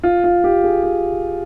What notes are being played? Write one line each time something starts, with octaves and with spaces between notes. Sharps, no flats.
F4
F4
G4
G#4
G4